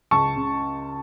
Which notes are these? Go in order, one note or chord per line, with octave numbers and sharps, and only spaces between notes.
C#2 A5 C#6
C#3